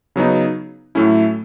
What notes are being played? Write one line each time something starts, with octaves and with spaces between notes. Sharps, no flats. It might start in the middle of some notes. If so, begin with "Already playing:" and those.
C#3 F#3 B3 D#4
A2 F#3 A3 C#4 E4